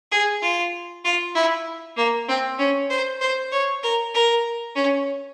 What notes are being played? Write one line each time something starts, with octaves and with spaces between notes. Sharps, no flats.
G#4
F4
F4
E4
A#3
C4
C#4
C5
C5
C#5
A#4
A#4
C#4